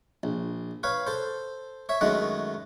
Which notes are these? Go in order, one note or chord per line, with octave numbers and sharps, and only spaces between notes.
A#1
B4 C#5 F5
A4 C5
C#5 E5
F#2 D#3 G#3 A3 F#5